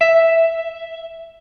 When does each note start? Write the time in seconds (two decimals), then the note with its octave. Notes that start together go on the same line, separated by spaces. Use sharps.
0.01 E5